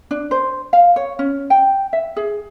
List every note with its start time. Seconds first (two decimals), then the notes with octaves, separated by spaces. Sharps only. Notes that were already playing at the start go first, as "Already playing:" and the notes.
0.11 D4
0.31 C5
0.73 F5
0.96 C#5
1.19 C#4
1.50 G5
1.93 E5
2.17 G#4